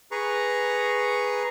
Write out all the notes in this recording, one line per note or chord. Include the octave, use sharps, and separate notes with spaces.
G#4 B4 A#5 C#6